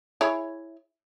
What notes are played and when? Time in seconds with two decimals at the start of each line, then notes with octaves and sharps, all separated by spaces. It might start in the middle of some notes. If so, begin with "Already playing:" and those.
0.21 E4 G#4 C#5